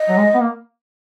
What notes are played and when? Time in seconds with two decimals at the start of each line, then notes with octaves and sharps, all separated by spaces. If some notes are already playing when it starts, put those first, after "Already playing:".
Already playing: D#5
0.09 F#3
0.17 G#3
0.34 B3
0.41 A#3